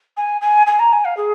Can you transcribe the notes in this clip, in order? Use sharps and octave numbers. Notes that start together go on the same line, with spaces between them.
G#5
G#5
G#5
A#5
G#5
F5
G#4